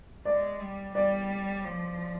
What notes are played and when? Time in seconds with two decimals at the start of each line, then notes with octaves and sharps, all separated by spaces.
0.25 G#3 D5
0.60 G3
0.95 G3 D5
1.65 F3